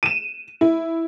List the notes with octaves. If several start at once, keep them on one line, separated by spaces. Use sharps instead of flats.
D#7 E7
E4